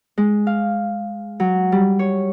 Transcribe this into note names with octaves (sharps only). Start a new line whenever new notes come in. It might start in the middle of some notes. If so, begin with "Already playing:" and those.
G#3
F5
F#3
G3
C#5